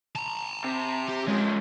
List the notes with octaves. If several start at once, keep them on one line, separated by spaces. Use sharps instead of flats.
A5 A#5
C3
G4
F3 G#3 C#4